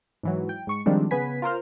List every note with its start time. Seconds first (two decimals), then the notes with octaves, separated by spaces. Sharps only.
0.23 G#2 E3 F#3
0.49 G5
0.67 G#2 C#6 C#7
0.86 D#3 F3 G3 G#3 C4 D4
1.11 C#3 B3 B4 G#5 B6
1.42 F4 A#4 C5 F6